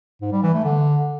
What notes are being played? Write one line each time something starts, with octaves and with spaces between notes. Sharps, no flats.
G#2
G3
E3
A3
D3